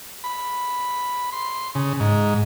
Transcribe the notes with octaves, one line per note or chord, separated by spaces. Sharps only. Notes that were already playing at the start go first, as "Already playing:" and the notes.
B5
C6
C#3
G#2